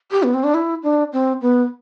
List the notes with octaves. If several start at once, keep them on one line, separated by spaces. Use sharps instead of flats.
G4
B3
C4
D4
E4
D4
C4
B3